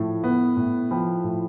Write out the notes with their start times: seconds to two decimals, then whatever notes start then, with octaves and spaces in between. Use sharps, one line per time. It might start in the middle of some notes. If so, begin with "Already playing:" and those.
Already playing: A2 F3
0.24 B3
0.57 A2
0.91 F3 G5 B5
1.24 A2